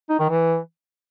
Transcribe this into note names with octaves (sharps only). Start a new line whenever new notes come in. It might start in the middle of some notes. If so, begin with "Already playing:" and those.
D#4
D#3
E3